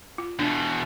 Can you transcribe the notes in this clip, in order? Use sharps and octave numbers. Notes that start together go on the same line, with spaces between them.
F4
E2 B2 D4